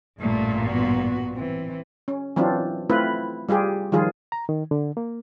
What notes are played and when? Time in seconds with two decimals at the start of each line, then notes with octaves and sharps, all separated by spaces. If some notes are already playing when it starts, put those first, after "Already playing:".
0.21 A1 G2 A#2 A3
0.66 B3 F#4
1.33 E3 C4
2.08 C#4
2.36 E3 F#3 C4 D4 F4
2.90 A3 C4 E4 F4 B4
3.49 G3 F4 G4 G#4
3.92 D#3 F3 G3 F4 G#4
4.32 A#5
4.49 D#3
4.71 D3
4.97 A#3